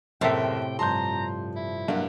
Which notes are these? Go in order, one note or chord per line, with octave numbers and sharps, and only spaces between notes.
F#1 A2 C3 A#4 E5 G5 A5
G2 F3 A5 A#5 C6 G6
E4
G2 F#3 A#3 B3